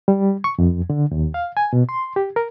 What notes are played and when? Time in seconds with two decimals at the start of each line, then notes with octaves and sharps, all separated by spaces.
0.08 G3
0.44 C#6
0.58 F2
0.90 D3
1.11 D#2
1.34 F5
1.57 G#5
1.73 B2
1.89 C6
2.16 G4
2.36 A#4